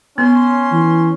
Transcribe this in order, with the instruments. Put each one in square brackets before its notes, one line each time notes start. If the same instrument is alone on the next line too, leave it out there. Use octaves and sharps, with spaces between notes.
[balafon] B3 [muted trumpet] C#4 [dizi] C6
[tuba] E3